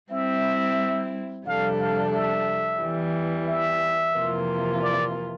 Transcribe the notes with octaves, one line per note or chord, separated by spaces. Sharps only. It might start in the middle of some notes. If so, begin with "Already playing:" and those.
G3 C4 E4 E5
F2 C3 G3 D4 A4 F5
F5
E5
E2 E3 G3
E5
F2 C3 E3 A#3 F4
D5